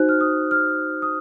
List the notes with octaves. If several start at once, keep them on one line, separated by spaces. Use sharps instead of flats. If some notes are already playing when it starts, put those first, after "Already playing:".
Already playing: D#4 F#4 C5 F#6
F6
D#6
F6
D#6